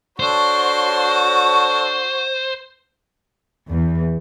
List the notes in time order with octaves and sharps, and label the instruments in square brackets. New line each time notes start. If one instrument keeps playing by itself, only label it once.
[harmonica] D4 A4 C#5 [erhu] F#4 [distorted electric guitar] C5
[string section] E2